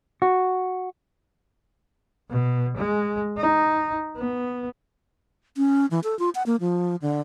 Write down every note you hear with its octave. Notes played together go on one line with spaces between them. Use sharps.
F#4
B2
G#3
D#4
B3
C#4
E3
A4
F4
F#5
A#3
F3
D3